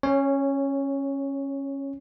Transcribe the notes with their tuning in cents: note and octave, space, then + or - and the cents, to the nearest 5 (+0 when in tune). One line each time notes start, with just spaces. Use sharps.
C#4 -15 C#5 +5